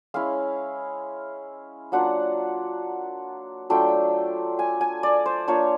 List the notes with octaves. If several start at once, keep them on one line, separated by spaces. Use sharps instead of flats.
G#3 C#4 E4 F5
F#3 A#3 D4 F4 F#5
F#3 A3 D4 F4 G5
G#5
G#5
D5
C5
A#3 D4 F4 C#5